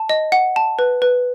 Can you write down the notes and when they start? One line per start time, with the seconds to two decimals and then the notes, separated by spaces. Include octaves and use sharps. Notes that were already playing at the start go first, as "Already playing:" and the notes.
Already playing: A5
0.10 D#5
0.32 F#5
0.56 A5
0.79 B4
1.02 B4